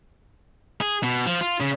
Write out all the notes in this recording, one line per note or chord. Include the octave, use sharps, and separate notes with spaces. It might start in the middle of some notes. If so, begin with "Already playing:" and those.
G#4
B2
F3
F4
C#3